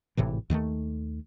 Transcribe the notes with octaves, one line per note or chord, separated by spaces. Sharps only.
G#1 A2 C3 E3
D#2 D#3 G#3 A3